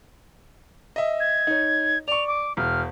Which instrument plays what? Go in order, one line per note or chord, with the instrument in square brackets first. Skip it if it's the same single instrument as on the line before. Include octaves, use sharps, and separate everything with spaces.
[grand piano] D#5 E5
[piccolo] G#6
[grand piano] D#4 C#5
[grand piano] D5 C#6 [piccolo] F7
[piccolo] D6
[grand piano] E1 [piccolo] F6